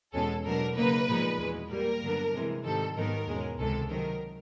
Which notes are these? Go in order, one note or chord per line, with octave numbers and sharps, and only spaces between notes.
E2 B2 G#3 C#4 A4
B2 F#3 A3 D4 A#4
C#3 F#3 A#3 D#4 B4
A#2 F3 G#3 B3 D#4
E2 B2 G#3
A#2 G3 A#3 A#4
G2 D3 F#3 B3 D4
C3 E3 G#3
G#2 D#3 G3 C4 A4
G#2 D#3 F#3 B3 A#4
E2 B2 G#3 C#4
C#2 C3 D#3 G#3 A4
C3 D#3 F#3 A#4